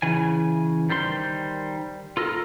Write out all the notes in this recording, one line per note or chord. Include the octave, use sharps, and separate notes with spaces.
C#3 E3 G#5
D#3 G3 C5 C6
F4 A4 A#4